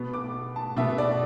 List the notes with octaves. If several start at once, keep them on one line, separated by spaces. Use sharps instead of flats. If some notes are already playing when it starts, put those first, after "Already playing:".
Already playing: B2 B3
D6
A5
B2 B3 E5
D5